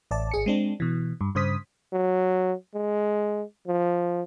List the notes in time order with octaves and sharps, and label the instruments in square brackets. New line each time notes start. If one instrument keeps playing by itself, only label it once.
[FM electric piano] A1 D5 A5
G#1 G#4 C#7
G#3 C4 D4
B2 E3
G2
G2 C#3 C5 D#6 B6
[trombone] F#3
G#3
F3